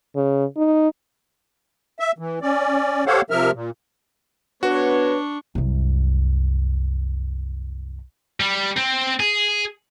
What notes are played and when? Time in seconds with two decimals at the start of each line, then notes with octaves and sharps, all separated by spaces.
0.16 C#3
0.57 D#4
2.00 E5
2.19 E3
2.42 C#4 D5
3.07 G4 A4 C5 C#5 F5 F#5
3.30 C3 F3 A#4 E5 F6
3.54 A#2
4.63 B3 D4 F#4 B4 C#5 C#6
5.55 C2 F#2
8.40 G3
8.77 C4
9.20 G#4